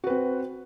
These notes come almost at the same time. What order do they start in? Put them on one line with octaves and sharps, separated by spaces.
F#4 B4 C4